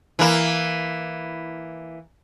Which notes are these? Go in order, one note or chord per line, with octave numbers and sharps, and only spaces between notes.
E3 A#3